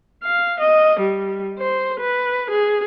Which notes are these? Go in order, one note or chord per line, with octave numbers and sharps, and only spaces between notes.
F5
D#5
G3
C5
B4
G#4